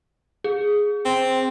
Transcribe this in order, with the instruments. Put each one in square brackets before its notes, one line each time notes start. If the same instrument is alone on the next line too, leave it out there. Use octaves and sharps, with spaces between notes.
[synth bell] G#4
[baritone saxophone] C4